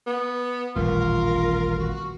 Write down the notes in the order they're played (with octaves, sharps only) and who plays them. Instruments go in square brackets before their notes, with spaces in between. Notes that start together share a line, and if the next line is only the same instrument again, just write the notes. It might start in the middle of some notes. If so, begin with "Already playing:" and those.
[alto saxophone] B3
[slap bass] D#1 A1 G3 [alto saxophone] F4 [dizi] A#4
[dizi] F#4